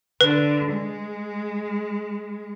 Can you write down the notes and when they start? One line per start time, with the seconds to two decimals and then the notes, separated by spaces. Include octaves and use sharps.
0.21 D3 B4
0.73 G#3